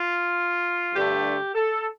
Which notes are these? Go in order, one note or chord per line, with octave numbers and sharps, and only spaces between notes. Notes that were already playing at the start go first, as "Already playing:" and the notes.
Already playing: F4
G2 D3 A3 G4
A4